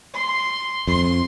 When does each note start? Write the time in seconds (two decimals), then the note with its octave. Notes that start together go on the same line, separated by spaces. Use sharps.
0.15 C6
0.87 F2 C6